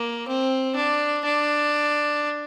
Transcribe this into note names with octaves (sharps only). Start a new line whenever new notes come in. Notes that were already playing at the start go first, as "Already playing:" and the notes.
Already playing: A#3
C4
D4
D4